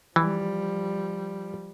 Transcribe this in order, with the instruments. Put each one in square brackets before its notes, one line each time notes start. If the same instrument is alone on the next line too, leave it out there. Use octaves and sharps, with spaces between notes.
[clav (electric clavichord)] E3 [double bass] F3 G3